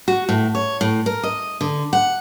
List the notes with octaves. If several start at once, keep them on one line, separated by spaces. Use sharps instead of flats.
F#4
A2
C#5
A2
A#4
D#5
D3
F#5